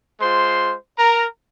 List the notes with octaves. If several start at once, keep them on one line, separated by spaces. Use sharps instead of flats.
G#3 F4 C5 C6
A#4 A#5